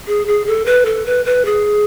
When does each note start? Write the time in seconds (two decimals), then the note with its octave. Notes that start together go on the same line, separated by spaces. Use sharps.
0.07 G#4
0.27 G#4
0.47 A4
0.66 B4
0.86 A4
1.06 B4
1.25 B4
1.45 G#4